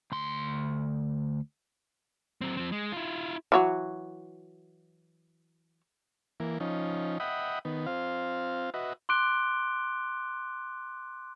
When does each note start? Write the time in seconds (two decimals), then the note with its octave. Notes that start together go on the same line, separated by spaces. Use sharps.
0.12 D2 C6
2.41 F#3 C4
2.57 F3 C4
2.72 G#3
2.92 E4 F4
3.52 E3 F#3 F#4
6.40 E3 A#3
6.60 F3 C#4 D#4
7.20 D#5 E5 F#5 G5 B5 D#6
7.65 D#3 B3
7.86 C4 F4 F5
8.74 F#4 B4 D#5 E5
9.09 C6 D6 F#6 D7 G7